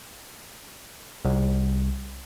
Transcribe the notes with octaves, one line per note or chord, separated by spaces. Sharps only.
C2